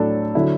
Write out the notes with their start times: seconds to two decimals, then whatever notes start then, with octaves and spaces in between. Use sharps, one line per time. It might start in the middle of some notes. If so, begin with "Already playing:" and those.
Already playing: A2 F#3 D4 A4
0.35 D3 F#3 E4